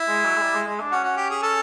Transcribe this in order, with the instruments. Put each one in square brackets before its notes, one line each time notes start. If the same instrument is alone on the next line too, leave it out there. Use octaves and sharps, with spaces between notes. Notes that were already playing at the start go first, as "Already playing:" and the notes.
Already playing: [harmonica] E4
[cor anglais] G#3
F#3
G#3
G3
G#3
G#3
D4
[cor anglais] C#4 [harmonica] F#4
[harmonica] F#4
G4
G#4
A4